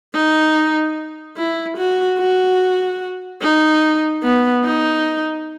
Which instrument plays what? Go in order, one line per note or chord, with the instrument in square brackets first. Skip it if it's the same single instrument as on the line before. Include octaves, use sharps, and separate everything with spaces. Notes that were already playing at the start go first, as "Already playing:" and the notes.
[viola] D#4
E4
F#4
F#4
D#4
B3
D#4